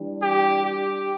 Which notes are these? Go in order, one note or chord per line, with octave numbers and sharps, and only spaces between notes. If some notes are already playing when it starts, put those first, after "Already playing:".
Already playing: E3 G3 D4
G4
G4